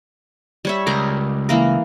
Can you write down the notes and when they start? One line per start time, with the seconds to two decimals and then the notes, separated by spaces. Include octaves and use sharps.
0.65 G3 C#5 E5
0.87 C#2 A#4
1.49 E3 A#3 A#4